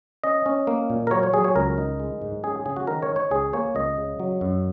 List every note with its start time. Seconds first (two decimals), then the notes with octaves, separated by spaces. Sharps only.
0.24 C#4 D#5
0.46 C#4
0.67 A#3
0.90 A#2
1.07 A#4
1.11 F#3 C#5
1.23 C#5
1.33 F#3 G#4
1.44 C#5
1.56 C#2 A#4
1.78 D#4
2.00 G#3
2.22 G#2
2.44 C#4 G#4
2.66 C#3 G#4
2.76 F#4
2.87 D#3 A#4
3.02 C#5
3.10 D#4
3.16 C#5
3.31 C#2 G#4
3.53 A#3 C#5
3.75 C#2 D#5
3.98 C#3
4.20 F#3
4.41 F#2